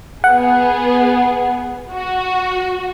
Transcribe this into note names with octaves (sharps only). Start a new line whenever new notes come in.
B3 G#4 F#5
F#4